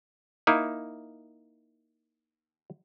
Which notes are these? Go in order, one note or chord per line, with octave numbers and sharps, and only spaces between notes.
A#3 D#4 E4